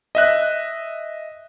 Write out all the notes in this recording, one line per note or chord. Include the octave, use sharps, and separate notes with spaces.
D#5 E5 F#6